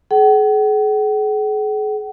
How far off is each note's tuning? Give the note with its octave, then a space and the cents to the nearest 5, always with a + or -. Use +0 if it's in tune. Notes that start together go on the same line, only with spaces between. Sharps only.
G#4 +40 F#5 +45